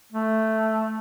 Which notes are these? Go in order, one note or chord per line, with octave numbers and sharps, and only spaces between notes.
A3